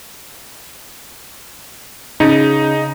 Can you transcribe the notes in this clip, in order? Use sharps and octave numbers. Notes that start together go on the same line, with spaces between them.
C#3 D#4